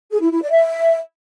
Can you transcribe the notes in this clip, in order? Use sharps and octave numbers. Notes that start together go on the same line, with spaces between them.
G#4
E4
E4
D5
E5